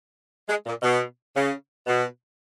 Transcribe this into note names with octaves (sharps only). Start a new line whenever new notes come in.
G#3
A#2
B2
C#3
B2